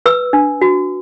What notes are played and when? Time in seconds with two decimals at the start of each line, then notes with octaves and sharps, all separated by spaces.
0.06 B4 E6
0.33 D4
0.61 F#4